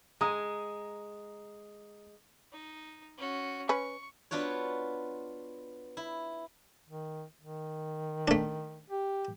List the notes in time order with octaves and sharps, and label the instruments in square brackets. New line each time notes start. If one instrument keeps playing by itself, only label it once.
[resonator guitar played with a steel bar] G#3 [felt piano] A#5 D#6
[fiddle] D#4
C#4 F#4
[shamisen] C#4 B4 [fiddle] C#6
[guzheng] B3 D4 F4 F#4 C#5
E4
[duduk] D#3
D#3
[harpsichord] A3 D4
[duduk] G4